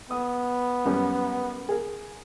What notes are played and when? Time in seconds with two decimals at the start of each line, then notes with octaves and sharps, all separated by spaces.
0.11 B3 D#6
0.85 F#2 G3 C#4
1.69 G#4 A#4